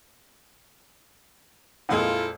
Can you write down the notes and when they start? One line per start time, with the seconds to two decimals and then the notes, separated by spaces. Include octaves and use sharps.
1.89 F2 A#2 G#3 E4 F4 A4